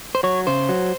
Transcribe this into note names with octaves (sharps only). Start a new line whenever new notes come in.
C5
F#3 C#5
C#3 C5
F#3